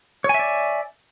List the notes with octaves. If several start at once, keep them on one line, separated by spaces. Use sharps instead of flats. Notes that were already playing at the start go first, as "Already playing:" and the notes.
C#5 D5 E5 G#5